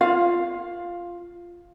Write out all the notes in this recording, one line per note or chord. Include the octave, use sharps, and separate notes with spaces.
F4 F5